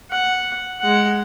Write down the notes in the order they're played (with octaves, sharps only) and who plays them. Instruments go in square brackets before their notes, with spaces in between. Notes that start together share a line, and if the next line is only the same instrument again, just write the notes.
[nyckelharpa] F#5
G#3 F#5